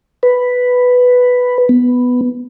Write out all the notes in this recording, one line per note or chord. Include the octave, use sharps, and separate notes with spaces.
B4
B3